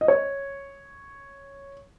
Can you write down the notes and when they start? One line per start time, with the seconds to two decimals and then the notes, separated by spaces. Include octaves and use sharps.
0.01 D#5
0.08 C#5